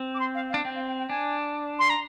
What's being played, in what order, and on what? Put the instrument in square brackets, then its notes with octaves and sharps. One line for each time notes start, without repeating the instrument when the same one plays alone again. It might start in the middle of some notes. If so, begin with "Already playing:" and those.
Already playing: [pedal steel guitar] C4
[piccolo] D6
C6
F5
F5
[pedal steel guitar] D4
[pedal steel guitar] C4 [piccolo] G5
[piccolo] F5
G5
G5
[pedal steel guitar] D4 [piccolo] G#5
[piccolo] C6
A#5